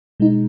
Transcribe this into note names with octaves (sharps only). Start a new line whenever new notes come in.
B2 G#3 D#4